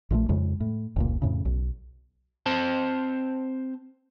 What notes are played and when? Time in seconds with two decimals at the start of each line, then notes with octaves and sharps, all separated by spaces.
0.10 A#1 A#2 F3 A3
0.29 F2 C#3 G#3
0.61 A2
0.96 F1 C#2 A#2
1.22 F2 A2 C#3
1.45 B1
2.46 C4 C5 A5